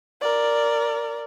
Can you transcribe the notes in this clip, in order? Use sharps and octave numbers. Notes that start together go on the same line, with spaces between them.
A#4 D5